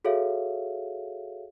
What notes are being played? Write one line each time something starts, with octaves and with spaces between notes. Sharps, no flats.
F#4 G#4 A4 C#5 E5 F5